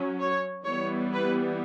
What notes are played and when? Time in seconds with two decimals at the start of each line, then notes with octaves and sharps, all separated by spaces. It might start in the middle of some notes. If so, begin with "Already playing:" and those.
Already playing: F#3 C#4
0.19 C#5
0.65 E3 G3 B3 C#5
1.13 B4